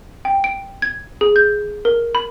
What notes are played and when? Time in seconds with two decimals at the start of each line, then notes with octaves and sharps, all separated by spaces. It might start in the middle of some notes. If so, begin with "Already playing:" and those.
0.25 G5
0.44 D7
0.82 G#6
1.21 G#4
1.36 G6
1.85 A#4
2.15 B5